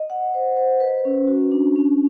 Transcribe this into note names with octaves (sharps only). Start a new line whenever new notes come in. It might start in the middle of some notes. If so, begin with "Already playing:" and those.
Already playing: D#5
F#5
C5
C5
B4
C#4
F#4
D4
C#4